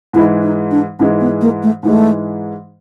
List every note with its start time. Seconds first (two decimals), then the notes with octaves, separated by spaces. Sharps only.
0.13 G#2 E3 G#3 E4
0.42 D#4
0.71 D4
0.99 G#2 E3 G#3 C#4
1.20 B3
1.41 A#3
1.63 A3
1.83 G#2 E3 G#3 A3